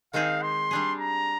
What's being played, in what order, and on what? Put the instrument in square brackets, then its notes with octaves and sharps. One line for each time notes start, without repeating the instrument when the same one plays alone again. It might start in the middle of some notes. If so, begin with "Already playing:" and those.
[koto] D#3 G#3 C4 D#4 G#4 [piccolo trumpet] F5
[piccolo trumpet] C6
[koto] G3 D4 G#4
[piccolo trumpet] A#5